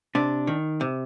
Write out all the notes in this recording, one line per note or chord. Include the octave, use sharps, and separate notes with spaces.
C3 D4
D#3
C3